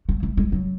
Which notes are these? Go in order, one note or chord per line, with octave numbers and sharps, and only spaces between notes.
A3
A3
G#3
F#3